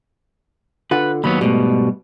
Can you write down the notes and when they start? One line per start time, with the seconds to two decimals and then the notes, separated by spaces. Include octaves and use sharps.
0.91 D3 F4 B4 F#5
1.24 D#2 F#3 B3 B5
1.41 G#2 B2 G3 A3